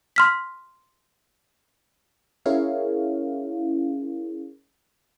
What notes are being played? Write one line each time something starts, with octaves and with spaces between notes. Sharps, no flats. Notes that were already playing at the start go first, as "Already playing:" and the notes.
C6 F6 B6
C#4 E4 G#4 A#4 C#5 F5